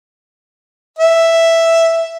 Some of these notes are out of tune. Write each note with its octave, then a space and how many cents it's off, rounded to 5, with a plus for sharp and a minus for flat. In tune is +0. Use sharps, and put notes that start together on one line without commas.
E5 +0